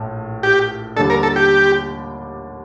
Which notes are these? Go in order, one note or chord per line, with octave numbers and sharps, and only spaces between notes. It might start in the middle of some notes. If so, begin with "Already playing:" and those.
Already playing: A#1 A2
G4
D#2 D3 G3 D4 A4
A#4
A4
G4